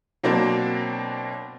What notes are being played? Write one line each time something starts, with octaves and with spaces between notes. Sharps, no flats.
B2 F#3 A#3 C4 D4